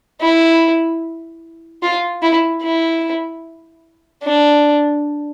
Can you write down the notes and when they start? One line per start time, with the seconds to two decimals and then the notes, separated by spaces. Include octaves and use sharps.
0.21 E4
1.83 F4
2.22 E4
2.63 E4
4.24 D4